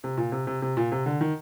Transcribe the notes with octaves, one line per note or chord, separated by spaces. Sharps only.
C3
A#2
C3
C3
C3
A#2
C3
D3
D#3